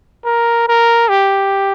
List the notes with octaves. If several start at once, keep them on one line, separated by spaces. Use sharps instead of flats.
A#4
A#4
G4